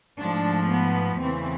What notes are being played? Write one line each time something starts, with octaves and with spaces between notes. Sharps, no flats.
G#2 F3 A3 D4
B3
E2 C#3 E3 A3 C4